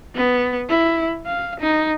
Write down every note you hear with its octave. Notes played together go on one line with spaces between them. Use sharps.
B3
E4
F5
D#4